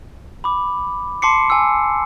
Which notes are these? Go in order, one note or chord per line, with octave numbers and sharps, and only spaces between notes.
B5 D6
A5 C6 D6 C7 C#7
G#5 E6